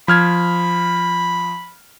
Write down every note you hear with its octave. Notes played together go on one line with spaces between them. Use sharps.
F3 B5 F6 G#6